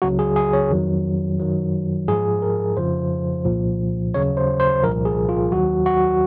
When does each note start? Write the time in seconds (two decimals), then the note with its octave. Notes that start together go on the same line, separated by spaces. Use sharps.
0.02 C#2 C#3 F#3 F#4
0.19 G#4
0.36 G#4
0.53 C#5
0.70 F2 D#3 F#3
1.39 F#2 D#3 F#3
2.08 G#2 F3 G#4
2.42 A#4
2.77 F2 C#3 F3 C5
3.45 C2 A#2 F3
4.14 D#2 C#3 F#3 C#5
4.37 C5
4.60 C5
4.83 C2 A#2 F3 A#4
5.05 G#4
5.29 F4
5.52 D#2 D#3 F#3 F#4
5.86 F#4